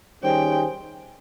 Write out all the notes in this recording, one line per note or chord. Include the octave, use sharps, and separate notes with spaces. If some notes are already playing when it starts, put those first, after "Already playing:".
D#3 G3 C#4 G#4 C5 G5